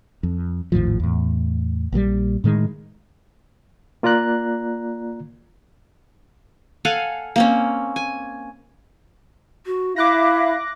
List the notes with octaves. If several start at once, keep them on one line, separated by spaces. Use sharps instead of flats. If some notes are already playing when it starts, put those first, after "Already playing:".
F2
G#1 D#2 A2 F3
E2 A2
A#1 A#2 F3 G3
A2 D#3 G#3
A#3 F4 D5 A#5 F#6
A4 F5 F#5 G#5
A#3 C4 C#4
G#5
F#4
E4 E5 F5 D6 F#6 A#6